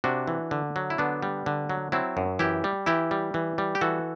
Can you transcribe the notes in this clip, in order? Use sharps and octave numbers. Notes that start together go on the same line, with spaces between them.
C3 D4 F#4
E3
D3
F#3
E4
D3 B3 D4
G3
D3
F#3
F#3 C4 E4
F#2
E3 E4 G4
G3
E3 E4 G4
G3
E3
G3
G4
E3 F#4 A4